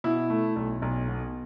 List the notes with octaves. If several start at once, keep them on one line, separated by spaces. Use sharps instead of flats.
B2 E4
A3
B1
B1
B2